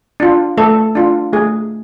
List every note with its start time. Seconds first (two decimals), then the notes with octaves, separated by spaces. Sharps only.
0.20 D4 F4
0.57 A3 A4
0.95 D4 F4
1.33 A3 G#4